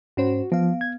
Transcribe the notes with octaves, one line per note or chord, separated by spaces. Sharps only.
G#2 C#4 F#4 C5
F3 B3 F5
G#6